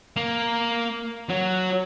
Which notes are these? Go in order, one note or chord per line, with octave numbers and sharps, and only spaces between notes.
A#3
F#3